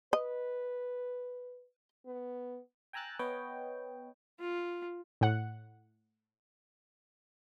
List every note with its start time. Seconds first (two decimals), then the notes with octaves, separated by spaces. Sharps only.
0.13 B4 D#5
2.06 B3
2.93 G5 G#5 A#5 E6 F#6 A6
3.19 B3 B4 C#5 D#5 G5
4.40 F4
5.21 A2 F#5